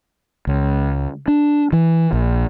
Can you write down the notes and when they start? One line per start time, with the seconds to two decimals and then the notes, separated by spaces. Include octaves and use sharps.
0.47 C#2
1.28 D4
1.73 E3
2.13 A#1